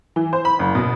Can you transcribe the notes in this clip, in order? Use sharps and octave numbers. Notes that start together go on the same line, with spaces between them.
E3
C5
B5
F#1
B2